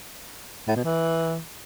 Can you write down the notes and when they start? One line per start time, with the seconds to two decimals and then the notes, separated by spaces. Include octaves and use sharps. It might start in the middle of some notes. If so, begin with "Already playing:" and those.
0.68 A2
0.76 B2
0.84 E3